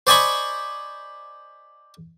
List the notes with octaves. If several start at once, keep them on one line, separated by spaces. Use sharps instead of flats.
C5 D5 D#5 G#5 B5 C#6